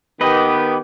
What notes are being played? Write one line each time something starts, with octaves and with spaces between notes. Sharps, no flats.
D#3 B3 G4 B4 D#5